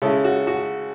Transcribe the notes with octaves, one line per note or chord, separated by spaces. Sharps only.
C#3 G#3 C#4 E4 A4
F#4
F#4